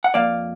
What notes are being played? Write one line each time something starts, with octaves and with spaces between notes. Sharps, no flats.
F#5
F2 F3 A#3 D5 F5